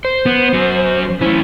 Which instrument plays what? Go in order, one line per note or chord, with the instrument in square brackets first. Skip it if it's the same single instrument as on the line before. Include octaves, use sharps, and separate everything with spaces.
[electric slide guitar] C5
[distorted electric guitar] B3
F#2 F#4
[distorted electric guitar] A3 C#4 [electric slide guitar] E4